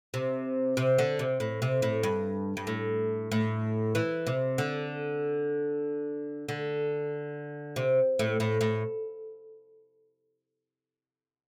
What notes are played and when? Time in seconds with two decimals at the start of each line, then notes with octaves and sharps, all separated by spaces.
0.14 C3
0.77 C3
0.98 D3
1.19 C3
1.40 A2
1.62 C3
1.82 A2
2.03 G2
2.57 G2
2.67 A2
3.32 A2
3.95 E3
4.27 C3
4.58 D3
6.49 D3
7.76 C3
8.19 A2
8.40 A2
8.61 A2